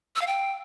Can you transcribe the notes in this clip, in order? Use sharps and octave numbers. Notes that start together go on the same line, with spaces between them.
E6
F5
G5